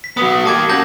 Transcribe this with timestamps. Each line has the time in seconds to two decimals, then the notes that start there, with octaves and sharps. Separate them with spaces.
0.04 B6
0.17 F#3 B3 D#6
0.46 A#3 G4 A5 D6 G#6
0.69 F#3 C#4 A5 G6 A#6